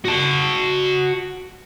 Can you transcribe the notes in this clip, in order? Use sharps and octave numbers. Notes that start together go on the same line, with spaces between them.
F#4 A5